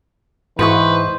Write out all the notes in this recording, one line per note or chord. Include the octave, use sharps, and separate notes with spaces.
G#2 E3 B4 C5 D#5 C#6